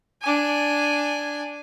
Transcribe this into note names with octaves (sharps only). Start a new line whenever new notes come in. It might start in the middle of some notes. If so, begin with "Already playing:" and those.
D4 G#5